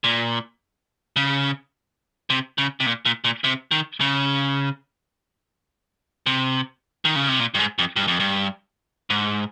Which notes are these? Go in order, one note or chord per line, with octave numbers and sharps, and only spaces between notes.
A#2
C#3
C3
C#3
C3
A#2
A#2
A#2
C3
D#3
C#3
C3
D#3
C#3
C3
A#2
G2
G#2
F2
G2
F2
G2
G#2